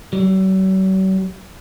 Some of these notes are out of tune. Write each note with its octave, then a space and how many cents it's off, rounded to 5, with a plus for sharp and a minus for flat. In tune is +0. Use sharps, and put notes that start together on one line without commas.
F#3 +45